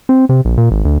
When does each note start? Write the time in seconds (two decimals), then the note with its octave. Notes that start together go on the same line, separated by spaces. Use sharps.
0.09 C4
0.29 C3
0.45 A#1
0.57 A#2
0.71 G#1
0.85 D2